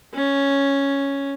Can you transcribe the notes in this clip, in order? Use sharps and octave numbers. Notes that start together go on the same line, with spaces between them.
C#4